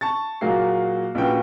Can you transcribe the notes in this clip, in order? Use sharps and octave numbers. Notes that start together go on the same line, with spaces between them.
A5 C#6 A6
A#2 F#3 A#3 F#4 G#4 C7
A#1 A#2 C#4 F#4 B4 G5